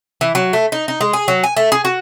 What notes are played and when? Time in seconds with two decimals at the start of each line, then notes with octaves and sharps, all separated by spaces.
0.21 E3
0.35 F#3
0.53 A3
0.72 D#4
0.88 D#4
1.01 G#3
1.13 G#4
1.28 F#3
1.44 G#5
1.57 A3
1.72 G#4
1.85 F#4